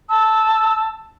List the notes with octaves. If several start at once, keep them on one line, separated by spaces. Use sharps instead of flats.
A5 E6